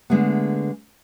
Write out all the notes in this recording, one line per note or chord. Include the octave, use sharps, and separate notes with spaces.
D3 G#3 A3 B3